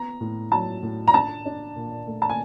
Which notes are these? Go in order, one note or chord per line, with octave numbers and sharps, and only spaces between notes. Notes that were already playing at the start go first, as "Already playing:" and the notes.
Already playing: B3 A#5
A2
F#3 A5
A2
A#5
D4 A5
D4
A#2
A3
A5
G#5